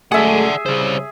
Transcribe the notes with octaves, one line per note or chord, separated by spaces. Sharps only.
F#2 G#3 A3 G#4 D5 E5 F#5
C#3 G3 C5